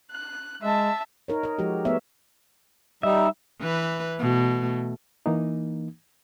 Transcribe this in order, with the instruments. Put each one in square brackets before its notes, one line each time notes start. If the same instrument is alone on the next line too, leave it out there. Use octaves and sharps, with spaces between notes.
[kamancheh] F#6
[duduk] G#3 [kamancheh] E5 A5
[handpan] D#4 A#4 C#5
A#4 D#5
F3 G#3 F#4 G4
A3 B3 C#5 E5
[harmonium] G3 D#4 [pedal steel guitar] E5
[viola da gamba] E3 B4
B2 A3
[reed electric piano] E3 A#3 D#4